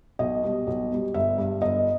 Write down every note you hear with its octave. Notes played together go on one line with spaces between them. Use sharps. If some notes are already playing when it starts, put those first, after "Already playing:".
B1 D#5
B2 G3
B1
B2 G3
G1 E5
G2 G3
G1 D#5